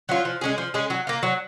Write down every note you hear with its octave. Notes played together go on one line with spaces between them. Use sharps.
F#3 C#4 F4
F3
G#3 C#4 G#4
F3
G#3 C#4 G#4
F#3
A#3 F4
F#3